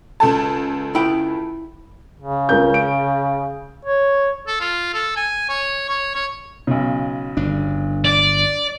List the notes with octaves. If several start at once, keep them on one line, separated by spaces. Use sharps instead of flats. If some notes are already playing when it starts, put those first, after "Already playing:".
C#2 A4 A5
E4 G5
C#3
C#2 A#4 G6
D7
C#5
A4
F4
A4
G#5
C#5
C#5
C#5
B1 C#3
G1 D4
D5